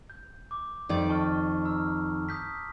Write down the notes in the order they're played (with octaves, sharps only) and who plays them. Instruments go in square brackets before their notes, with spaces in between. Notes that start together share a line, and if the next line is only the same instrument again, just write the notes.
[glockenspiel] G6
D6
[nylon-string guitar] F2 D#3 D5
[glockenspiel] A5 C#6 F6
A#5 E6 F6
D#6 G6 B6